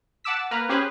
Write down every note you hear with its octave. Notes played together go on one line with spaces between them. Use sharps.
F#5 A5 D6 E6 B6
A#3 B4 A#5 F6
C#4 G4 G#4 B4 C5